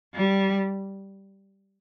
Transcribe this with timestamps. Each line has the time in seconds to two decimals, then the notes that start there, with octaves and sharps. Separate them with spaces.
0.15 G3